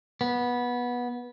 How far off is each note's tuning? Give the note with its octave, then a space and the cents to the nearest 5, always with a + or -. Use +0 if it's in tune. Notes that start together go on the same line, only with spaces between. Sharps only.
B3 -15